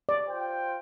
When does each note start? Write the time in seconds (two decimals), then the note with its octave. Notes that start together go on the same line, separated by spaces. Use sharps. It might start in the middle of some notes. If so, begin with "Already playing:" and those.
0.09 D5
0.25 F4 C5 G5